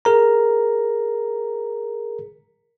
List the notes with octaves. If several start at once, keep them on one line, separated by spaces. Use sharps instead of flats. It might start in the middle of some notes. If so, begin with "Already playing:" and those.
G#4 A#4 A#5